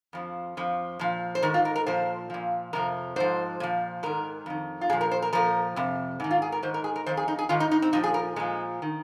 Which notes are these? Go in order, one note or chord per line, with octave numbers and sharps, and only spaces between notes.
F2 F3
F2 F3
A#2 F3
C5
G#2 D#3 A#4
F4
A#4
A#4
A#2 F3 C5
A#2 F3
F2 C3 F3 A#4
G#2 F3 C5
A#2 F3
G#2 D#3 A#4
F2 D#3
F4
A#2 F3 G#4
A#4
C5
A#4
A#2 F3 A#4
F2 C3
G#2 D#3
F4
G#4
A#4
G#2 D#3 C5
A#4
G#4
A#4
F2 D#3 C5
G#4
D#4
G#4
G#2 D#3 F4
D#4
D#4
C4
A#2 F3 D#4
G#4
A#4
A#2 F3 G#3
D#3